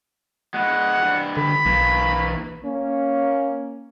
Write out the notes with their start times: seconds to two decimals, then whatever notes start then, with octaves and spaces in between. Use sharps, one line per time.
0.54 G#3 E4 F#5
1.03 G2 E4
1.37 D3 B5
1.66 B1 E3 A#3
2.62 A#3 C#4